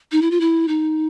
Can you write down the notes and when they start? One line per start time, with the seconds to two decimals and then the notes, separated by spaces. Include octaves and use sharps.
0.12 D#4
0.22 E4
0.31 F4
0.41 E4
0.68 D#4